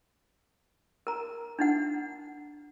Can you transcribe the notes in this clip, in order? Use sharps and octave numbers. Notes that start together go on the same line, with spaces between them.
A#4 A#5
D4 D#4 F#5